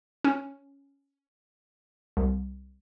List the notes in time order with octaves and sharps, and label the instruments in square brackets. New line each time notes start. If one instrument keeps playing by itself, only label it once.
[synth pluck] C#4
C2